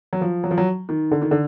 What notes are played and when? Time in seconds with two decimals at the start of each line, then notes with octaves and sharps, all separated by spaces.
0.13 F#3
0.21 F3
0.44 F#3
0.51 F3
0.58 F#3
0.89 D#3
1.11 D3
1.22 D#3
1.31 D3